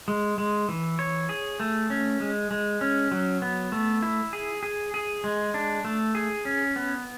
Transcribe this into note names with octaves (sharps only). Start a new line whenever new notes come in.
G#3
G#3
E3
C#5
G#4
A3
C#4
G#3
G#3
C#4
F#3
B3
A3
E4
G#4
G#4
G#4
G#3
D4
A3
G#4
C#4
B3